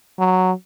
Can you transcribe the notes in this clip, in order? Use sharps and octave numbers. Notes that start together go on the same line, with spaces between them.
F#3